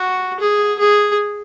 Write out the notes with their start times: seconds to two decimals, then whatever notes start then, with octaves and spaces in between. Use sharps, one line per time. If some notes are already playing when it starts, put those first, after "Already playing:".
Already playing: F#4
0.40 G#4
0.79 G#4